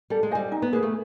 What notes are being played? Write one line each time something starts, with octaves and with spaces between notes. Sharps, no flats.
G3 A4
G#3
G3 C5 D#5 G#5
D#4
B3
A#3 G#4 B4
A3